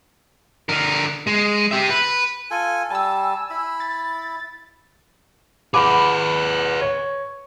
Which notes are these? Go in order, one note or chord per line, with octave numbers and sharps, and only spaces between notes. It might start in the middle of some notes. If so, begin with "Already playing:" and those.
D3 A#4
G#3
G4 E5
B4
F4 A4 G#5
G3 G#5 A5 E6
E4 B5
A6
G#4 B4 F#5 B5 D6
C#5